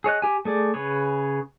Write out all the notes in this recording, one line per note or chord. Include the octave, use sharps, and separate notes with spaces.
G#4 C#5 D#5 F#6
G4 G#5
A3 G#4 D5
C#3 G#4 B4 C#5